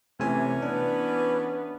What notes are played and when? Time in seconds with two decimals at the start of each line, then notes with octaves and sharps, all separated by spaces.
0.20 C3 E3 A3 C#4 G#5
0.62 B3 D4